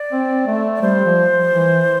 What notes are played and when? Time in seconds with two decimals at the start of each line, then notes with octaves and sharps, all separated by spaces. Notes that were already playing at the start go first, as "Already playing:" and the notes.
Already playing: D5
0.12 C4
0.47 A3
0.75 D5
0.82 G3 C5
1.05 F3
1.51 E3